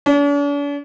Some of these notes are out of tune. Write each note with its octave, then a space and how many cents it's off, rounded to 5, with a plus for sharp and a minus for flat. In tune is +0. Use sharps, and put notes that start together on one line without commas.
D4 -45